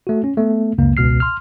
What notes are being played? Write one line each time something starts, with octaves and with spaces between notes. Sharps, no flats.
A3 F#4
C#4
A3 B3
C#2 F#2 C#3 A#3
G#1 C#2 B2 F6 C7
C6 F6